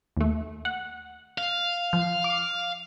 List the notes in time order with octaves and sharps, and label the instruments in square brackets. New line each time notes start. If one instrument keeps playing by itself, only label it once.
[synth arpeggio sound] D#2 A3
F#5
[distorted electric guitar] F5
[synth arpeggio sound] F3
D6